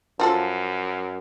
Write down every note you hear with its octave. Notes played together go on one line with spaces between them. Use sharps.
F#2 F3 F4 A4